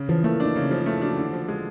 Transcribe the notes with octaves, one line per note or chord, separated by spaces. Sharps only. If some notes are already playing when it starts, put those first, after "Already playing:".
Already playing: C#3
E3 F3
A3 A#3
D4
D#4
C#3
F3
A3 E4
D4 F#4
D3 E4
F3
G#3